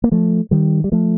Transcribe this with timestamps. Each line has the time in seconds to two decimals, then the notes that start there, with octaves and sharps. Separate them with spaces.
0.04 A#3
0.12 F3 A3
0.51 D#3 G3
0.84 G3
0.92 F3 A3